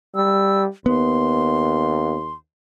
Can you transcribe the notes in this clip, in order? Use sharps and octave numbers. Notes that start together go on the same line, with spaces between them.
G3 E6
D#2 B3 C6